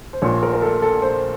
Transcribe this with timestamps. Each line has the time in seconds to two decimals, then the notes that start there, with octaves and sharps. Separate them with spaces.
0.13 C5
0.22 A#1 A#2 F3 C#5
0.43 A#4
0.53 A#4
0.62 A4
0.82 A4
1.02 C5